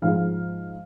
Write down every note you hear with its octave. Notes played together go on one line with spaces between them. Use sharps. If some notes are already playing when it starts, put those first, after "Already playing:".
G#2 F3 G#3 F5